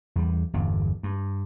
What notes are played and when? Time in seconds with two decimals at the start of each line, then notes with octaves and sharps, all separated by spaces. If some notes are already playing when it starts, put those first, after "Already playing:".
0.16 E2 G3
0.53 G1 E2 G2
1.03 G2